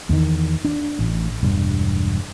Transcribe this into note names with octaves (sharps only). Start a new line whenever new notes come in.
E2 D#3
D4
A1
E1 G2